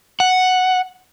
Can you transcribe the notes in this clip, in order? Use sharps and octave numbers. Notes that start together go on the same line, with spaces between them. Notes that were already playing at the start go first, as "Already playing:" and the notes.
F#5